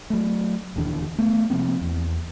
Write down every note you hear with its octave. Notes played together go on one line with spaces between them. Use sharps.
F#3 A3
D#1 D#2 D3 E3
A3 B3
C3 F3 A#3 C4
E2